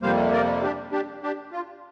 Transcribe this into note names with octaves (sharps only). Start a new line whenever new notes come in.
F2 C3 G3 A#3 C5 F5
A#4 D5
D4 G4
D4 G4
D4 G4
F4